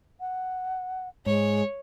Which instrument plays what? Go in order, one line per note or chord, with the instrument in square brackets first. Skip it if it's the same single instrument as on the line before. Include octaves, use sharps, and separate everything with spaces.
[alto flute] F#5
[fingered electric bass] G#2 [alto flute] G#3 [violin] C#5